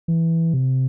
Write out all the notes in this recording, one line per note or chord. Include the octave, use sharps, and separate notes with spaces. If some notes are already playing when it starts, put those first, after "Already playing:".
E3
C3